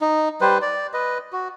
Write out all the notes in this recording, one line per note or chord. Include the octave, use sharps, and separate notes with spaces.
D#4
G3 B4 C5
D5
B4 D#5
F#4